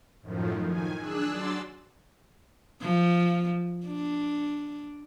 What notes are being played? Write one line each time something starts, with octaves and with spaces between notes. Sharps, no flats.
F#2 A2 D#3 F3
D#3 G#5
D4 G#4 E6 F#6
F#3 D5 C6 E6 A6
F3
D4